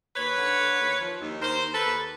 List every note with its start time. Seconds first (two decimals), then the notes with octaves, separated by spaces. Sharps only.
0.16 D#2 B4 C#5
0.38 D3
0.59 D3
0.79 D#2
1.00 F3
1.21 D#2
1.42 D#2 A#4 C5
1.63 D#2
1.73 A4 B4
1.84 D#2